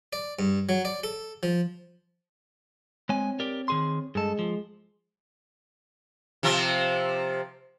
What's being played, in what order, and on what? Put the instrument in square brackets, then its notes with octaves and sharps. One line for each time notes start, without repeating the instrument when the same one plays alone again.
[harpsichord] D5
G2
F#3
D5
A4
F3
[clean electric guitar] G#3 G#5 [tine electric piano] C4 C#5
[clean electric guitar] G4 A#4 D5
D#3 G#4 C6
[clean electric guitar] G2 A4 [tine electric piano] G#3 G#4
[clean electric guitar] F3
[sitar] C3 F3 C4